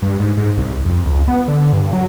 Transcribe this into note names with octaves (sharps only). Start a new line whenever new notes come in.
G2
G#2
G#2
C2
F2
C#2
B3
D3
G2
F#3